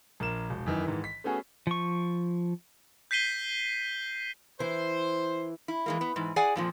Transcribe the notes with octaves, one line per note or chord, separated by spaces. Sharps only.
A#1 A#4 E7
E1
F#2 D#3 E3
G#2 D#3 E3
B6
A3 B3 C#4 F#4 G#4
F3 C#6
G6 B6 C7 D#7 G7
E3 C5
E4
E3 G#3 A#3
B3
G#2 E3
G#4 D5 F#5 G#5
F2 A#2 F3